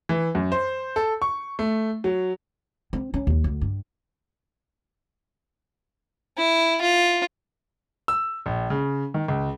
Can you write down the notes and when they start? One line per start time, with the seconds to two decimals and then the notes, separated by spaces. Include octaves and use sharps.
0.09 E3
0.35 F#2
0.52 C5
0.96 A4
1.22 C#6
1.59 A3
2.04 F#3
2.93 C4
3.14 C#4
3.27 D#2
3.44 D2
3.61 G2
6.38 E4
6.82 F4
8.08 E6
8.46 A#1
8.70 C#3
9.14 D#3
9.28 C#2